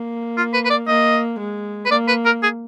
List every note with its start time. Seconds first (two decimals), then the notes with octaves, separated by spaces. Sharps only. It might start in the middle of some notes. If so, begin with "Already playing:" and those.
Already playing: A#3
0.37 F4
0.53 B4
0.65 B4
0.70 D5
0.87 A#3 D#5
1.39 G#3
1.85 B4
1.91 A#3 D5
2.08 B4
2.25 A#4
2.42 G#4